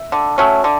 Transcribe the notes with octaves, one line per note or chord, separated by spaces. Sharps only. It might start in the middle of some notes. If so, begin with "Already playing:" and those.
Already playing: E5
D3
F#3 A3 C#4
D3